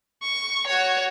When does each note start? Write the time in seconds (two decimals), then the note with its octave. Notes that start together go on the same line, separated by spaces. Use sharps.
0.22 C#6
0.67 F#4 C#5